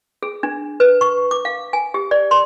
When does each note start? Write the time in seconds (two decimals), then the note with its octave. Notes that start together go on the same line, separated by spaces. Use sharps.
0.23 G#4
0.43 D4
0.80 B4
1.01 C#6
1.31 D6
1.45 F5
1.73 G#5
1.94 G4
2.11 D5
2.31 C6